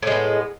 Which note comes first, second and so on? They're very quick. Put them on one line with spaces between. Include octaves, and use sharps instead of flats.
A2 G#3 B3